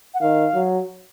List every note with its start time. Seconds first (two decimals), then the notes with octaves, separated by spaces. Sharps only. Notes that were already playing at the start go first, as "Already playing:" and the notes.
0.14 F#5
0.20 D#3 F5
0.54 F#3